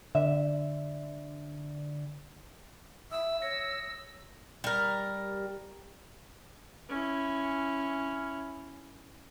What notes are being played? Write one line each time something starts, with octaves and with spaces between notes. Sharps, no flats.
D3 E5
E5 D#6 E6
C#5 A#6 C#7
G3 A#4
C#4 E4